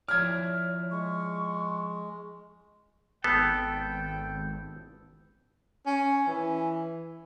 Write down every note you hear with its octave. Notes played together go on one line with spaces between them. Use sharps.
F3 E4 C#5 D5 F6 G#6
G#3 C#6
G#1 B3 A4 G5
C#4
E3